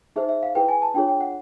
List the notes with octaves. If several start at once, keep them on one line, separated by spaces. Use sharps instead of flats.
D#4 G#4 C5 E5
E5
F5
E4 G#4 B4 G5
G#5
A5
D4 F4 G#4 C#5 G5
G5
F#5